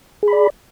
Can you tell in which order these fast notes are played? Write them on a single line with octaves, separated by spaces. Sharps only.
G#4 B5 D5